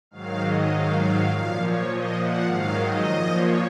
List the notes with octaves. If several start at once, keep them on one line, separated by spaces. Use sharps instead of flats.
G#2 D#3 F#3 F5
D#5
G#2 D#3 F#3 F5
F5
A#2 F3 F5
C#5
A#2 F3 D#5
F#5
G#2 D#3 F#3 F5
D#5
A#2 F3
C#5